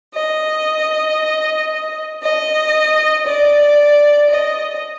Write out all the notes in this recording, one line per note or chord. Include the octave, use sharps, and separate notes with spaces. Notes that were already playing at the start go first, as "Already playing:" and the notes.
D#5
D#5
D5
D#5